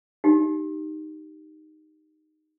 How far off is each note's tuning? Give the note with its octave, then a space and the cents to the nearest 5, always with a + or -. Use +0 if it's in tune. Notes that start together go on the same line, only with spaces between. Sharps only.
D#4 -5 G4 -10